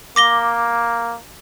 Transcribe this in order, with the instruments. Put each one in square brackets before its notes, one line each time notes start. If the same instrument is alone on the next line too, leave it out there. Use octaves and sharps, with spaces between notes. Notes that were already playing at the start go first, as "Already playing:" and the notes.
[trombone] A#3 [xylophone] D6 A#6 G7